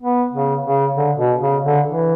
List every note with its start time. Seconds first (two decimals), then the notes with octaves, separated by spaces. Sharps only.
0.02 B3
0.33 C#3
0.64 C#3
0.96 D3
1.18 B2
1.41 C#3
1.64 D3
1.88 E3